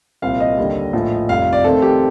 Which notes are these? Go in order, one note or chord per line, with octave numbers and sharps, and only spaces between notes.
C2 A#2 F3 C4 F5
D#5
D#2 D3 G3
A#1 A2 F3
F1 F2 C3 G3 F5
D5
F2 D#3 A3 C4 A4
G4